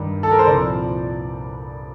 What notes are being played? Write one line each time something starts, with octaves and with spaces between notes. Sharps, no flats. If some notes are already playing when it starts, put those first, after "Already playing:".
Already playing: G2 D#3
A4
A#4
C5
C2 A#2 F3 D5